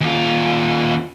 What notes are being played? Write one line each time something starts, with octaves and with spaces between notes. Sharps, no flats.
D#2 F4